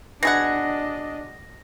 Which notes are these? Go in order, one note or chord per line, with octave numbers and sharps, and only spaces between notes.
B2 D4 G#4 D#5 F#5 A#6